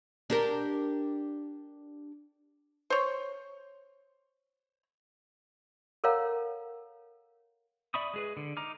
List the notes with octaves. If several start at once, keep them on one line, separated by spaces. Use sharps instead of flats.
D4 G4 A#4
C5 C#5
A4 A#4 C#5 F5 F#5 A#5
D5 E5 B5 C#6 D#6
G#3 G#4 B4
D3
D#4 A#5 D6 F6